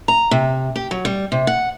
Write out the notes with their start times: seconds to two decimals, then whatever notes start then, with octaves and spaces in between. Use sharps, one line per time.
0.08 A#5
0.31 C3
0.76 G4
0.91 F#3
1.05 G3
1.32 C3
1.47 F#5